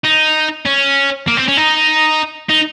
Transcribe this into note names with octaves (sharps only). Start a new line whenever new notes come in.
D#4
C#4
A#3
C4
C#4
D#4
D#4